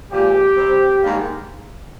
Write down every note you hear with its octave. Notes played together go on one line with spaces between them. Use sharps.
A#2 F3 G#3 G4
C3 G3 C4
G#2 D#3 G3 A#3